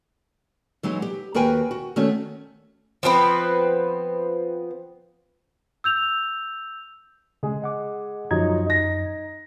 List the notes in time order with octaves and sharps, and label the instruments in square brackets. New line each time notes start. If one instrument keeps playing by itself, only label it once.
[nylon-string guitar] E3 F#3 G#3 D#4
G4
D#2 F#4 A#4 B4 G5 G#5
F#4
D#3 A3 C#4 F#4 C#5
[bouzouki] F3 B3 C4 B4
[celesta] E6 G6 F7
[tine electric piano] C#3 [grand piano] G#3 G#4
[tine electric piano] D#5 F#5 D6
[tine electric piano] F#2 A#5 G#6 [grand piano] F3 F#3 D#4
[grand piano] D#4 A#6